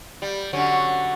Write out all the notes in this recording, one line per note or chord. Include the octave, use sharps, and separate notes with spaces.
G3
D3 F#3 C#4